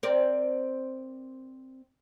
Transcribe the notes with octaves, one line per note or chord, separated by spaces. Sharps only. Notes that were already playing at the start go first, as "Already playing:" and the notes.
C4 A#4 D5